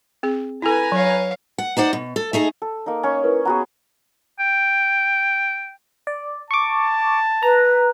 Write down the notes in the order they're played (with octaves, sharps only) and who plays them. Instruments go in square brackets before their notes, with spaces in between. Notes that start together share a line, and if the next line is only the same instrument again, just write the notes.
[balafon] C4 G#4
[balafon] E4 A4 [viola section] B4 G#5 A#5
[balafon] F#3 [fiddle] C#5 F5
[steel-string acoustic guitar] F#5
D#4 C5 D5 F#5
B2
A4
A3 D#4 G#4 D#5
[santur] A4
A#3 D#4
C#4 C#6
[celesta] E4 A#4 B4
[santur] B3 F#4 G#4 [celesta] A#5
[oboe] G5
[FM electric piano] D5
[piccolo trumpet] A5 [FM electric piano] C#6 D6
[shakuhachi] B4 [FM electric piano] A#5